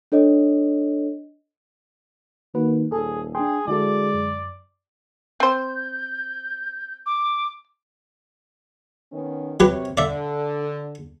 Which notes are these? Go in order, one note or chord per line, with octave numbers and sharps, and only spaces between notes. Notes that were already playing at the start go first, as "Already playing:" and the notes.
D4 A4 C#5 D#5
D#3 A#3 F#4 B4
D#1 G#4 A4
D4 G#4 G5 C6
D3 G#3 E4 F#4 A4 D5
F#2
C4 C5 G6
D6
D#3 B3 C#4
C3 F#3 G4 B4 C#5
D3 D5 E5